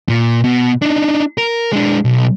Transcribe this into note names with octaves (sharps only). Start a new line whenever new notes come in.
A#2
B2
D4 D#4
A#4
G#3 D4
B1